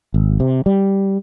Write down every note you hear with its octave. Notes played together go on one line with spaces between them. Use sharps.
G#1
C3
G3